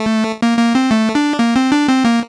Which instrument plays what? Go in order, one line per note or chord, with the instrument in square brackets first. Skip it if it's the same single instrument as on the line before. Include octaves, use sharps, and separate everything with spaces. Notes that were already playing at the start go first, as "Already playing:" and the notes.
Already playing: [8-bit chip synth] A3
A#3
A#3
C4
A3
D4
A#3
C4
D4
C4
A#3